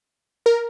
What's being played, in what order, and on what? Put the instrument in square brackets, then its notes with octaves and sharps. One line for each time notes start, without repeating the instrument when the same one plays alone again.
[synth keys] A#4